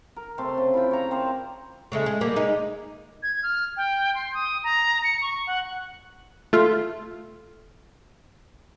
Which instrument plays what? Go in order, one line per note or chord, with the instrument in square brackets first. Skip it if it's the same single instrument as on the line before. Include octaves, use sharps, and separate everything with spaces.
[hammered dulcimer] A#4
C3 A3 C6
C#3
E4 F4 G5
C#5 A#5
C4 A#4 C5 D5
[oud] C#3 G#3 A3
G#3
G3 A#3
G#3 D#4
[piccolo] G#6
F6
G5
C6
D#6
A#5
C#7
C#6
F#5
[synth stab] A3 F4